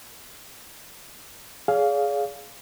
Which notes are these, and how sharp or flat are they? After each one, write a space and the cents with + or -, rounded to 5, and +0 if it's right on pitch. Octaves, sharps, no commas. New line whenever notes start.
G#4 +10 D5 -45 F5 +0